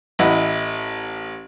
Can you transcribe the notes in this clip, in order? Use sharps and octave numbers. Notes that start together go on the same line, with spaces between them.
A1 E4 D#5 F#5 B5